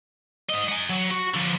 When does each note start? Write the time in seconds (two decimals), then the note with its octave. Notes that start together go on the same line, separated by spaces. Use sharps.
0.49 G#2 D#5
0.69 F#5 G#5
0.90 F#3
1.11 F#4
1.34 D3 F3